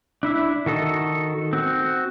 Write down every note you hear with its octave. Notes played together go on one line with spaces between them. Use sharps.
D4 E4 E5
D#3 F#4 A4 D#5
C4 F#4